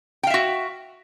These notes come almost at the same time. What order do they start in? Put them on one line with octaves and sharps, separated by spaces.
G5 F5 E5 F#4